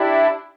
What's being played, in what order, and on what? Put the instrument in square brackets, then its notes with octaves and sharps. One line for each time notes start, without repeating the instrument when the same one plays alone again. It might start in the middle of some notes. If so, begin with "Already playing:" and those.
Already playing: [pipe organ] D4 E4 [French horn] G4